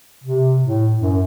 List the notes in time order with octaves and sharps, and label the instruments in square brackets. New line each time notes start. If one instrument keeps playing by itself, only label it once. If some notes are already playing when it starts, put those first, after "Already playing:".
[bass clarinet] C3
A2
F#2